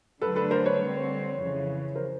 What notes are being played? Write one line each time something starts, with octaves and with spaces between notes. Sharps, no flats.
D3 F#3 A3 D4 A4 B4
A4 B4
A#4 C5
B4 C#5
D3 G3 C4
F2 C#3 E3
A#4 C5